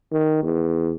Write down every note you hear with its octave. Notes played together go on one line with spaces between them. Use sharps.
D#3
E2